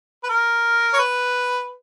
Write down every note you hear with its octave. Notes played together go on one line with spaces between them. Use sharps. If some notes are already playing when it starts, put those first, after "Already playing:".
B4
A#4
C#5
B4